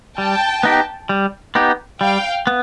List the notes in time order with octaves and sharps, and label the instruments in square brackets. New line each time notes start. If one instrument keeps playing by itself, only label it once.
[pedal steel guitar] G3 [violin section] G5 A5
[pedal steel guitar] B3 D#4 G4
G3
B3 D#4 G4
[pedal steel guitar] G3 [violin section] F5 G5
[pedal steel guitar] B3